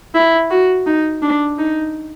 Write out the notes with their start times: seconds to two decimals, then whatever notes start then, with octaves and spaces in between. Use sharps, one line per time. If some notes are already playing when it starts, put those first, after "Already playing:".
0.15 E4
0.51 F#4
0.86 D#4
1.23 D4
1.59 D#4